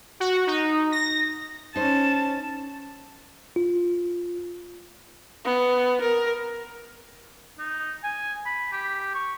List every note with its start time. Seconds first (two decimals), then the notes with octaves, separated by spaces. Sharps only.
0.20 F#4
0.47 D#4
0.92 A#6
1.76 C#4 D#4 C5 A5
3.56 F4
5.45 B3
6.01 A#4
7.59 D#4
8.04 G#5
8.46 B5
8.72 G4
9.14 C#6